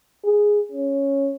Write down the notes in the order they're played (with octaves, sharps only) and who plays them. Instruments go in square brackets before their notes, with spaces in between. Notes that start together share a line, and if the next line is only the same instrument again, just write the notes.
[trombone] G#4
C#4